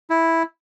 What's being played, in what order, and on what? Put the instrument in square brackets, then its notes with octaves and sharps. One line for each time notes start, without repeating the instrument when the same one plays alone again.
[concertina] E4